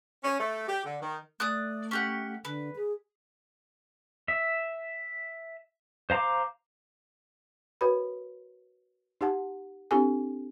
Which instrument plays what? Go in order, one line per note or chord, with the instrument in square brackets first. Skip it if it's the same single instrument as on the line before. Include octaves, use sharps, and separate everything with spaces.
[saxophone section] C#4
A3
G4
D3
D#3
[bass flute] A3 [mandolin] D5 D#6 F#6
[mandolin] C#4 G4 F#5
[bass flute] D3 [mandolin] B4
[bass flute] G#4
[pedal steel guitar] E5
C5 F5 A#5 C6 D6
[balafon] F#4 A#4 B4 C#5 B5
D#4 G4 F#5 A5
C4 D4 E4 G4 A4 G#5